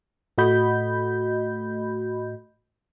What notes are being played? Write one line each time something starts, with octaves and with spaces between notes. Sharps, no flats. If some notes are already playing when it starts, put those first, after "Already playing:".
A2 A3 F#4 D#5 B5 G6